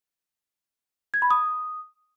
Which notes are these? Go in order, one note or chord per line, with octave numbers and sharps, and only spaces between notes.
G#6
B5
D#6